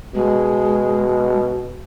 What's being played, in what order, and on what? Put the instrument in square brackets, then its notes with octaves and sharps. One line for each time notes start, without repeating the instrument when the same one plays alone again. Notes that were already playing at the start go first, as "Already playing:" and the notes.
[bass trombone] B2 [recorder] G#3